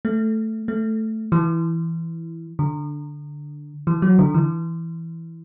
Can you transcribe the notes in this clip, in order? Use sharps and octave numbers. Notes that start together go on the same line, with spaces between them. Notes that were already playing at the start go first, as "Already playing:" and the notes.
A3
A3
E3
D3
E3
F#3
D3
E3